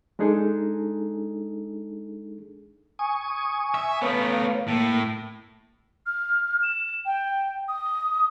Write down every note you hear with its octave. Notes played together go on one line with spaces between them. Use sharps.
G#3 D4 D#4 G#4 A4
G#5 C#6 D#6
E5
A3 B3 B4 C#5 F5
A2 A#3
F6
E7
G5
D#6